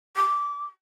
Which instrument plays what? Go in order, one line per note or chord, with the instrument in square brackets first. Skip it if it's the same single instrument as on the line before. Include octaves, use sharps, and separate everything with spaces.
[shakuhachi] D6